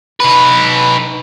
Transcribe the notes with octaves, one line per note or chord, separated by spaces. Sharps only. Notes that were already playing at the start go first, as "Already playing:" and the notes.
D#4 B4